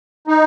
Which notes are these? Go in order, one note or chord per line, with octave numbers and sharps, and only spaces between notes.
D#4